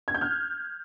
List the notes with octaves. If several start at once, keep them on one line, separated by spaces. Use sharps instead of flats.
G#6
G6
F6